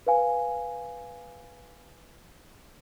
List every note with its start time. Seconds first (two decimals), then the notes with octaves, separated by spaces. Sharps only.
0.07 B4 C5 F5 G#5